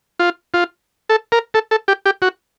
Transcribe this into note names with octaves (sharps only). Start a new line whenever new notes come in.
F4
F4
A4
A#4
A4
A4
G4
G4
F#4